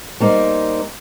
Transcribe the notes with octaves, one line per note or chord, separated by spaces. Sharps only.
G3 A#3 D#4 C5